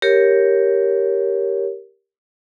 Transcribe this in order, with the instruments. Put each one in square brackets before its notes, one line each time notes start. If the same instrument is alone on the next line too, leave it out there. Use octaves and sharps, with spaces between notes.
[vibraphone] G4 A#4 C#5